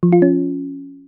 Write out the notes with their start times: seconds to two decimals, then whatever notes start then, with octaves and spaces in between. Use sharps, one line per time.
0.03 F3
0.13 F4
0.22 C#4